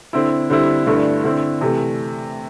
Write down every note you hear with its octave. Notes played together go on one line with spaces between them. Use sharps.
D3 C4 E4
D3 G3 C4 E4
G2 D3 A3 E4
D3 C4 E4
C3 E3 A3